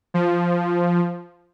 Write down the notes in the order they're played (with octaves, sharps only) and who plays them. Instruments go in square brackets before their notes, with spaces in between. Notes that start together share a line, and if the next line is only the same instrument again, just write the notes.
[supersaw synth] F3